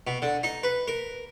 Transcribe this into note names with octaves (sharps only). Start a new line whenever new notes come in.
B2
D3
D#4
B4
A#4